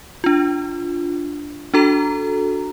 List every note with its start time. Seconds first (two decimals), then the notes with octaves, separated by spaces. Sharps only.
0.24 D4 F4
1.74 D4 F#4 A4 A#5